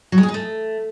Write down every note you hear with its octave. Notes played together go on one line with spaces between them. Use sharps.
F#3
G#3
G#4
D#4
A3